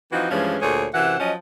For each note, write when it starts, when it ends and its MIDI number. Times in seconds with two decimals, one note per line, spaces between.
0.12 0.30 52
0.12 0.30 53
0.12 0.30 60
0.12 0.30 63
0.12 0.30 66
0.30 0.56 43
0.30 0.56 52
0.30 0.56 53
0.30 0.56 56
0.30 0.56 61
0.62 0.88 38
0.62 0.88 46
0.62 0.88 68
0.62 0.88 69
0.62 0.88 73
0.95 1.17 42
0.95 1.17 48
0.95 1.17 52
0.95 1.17 72
0.95 1.17 78
1.20 1.34 53
1.20 1.34 54
1.20 1.34 61
1.20 1.34 75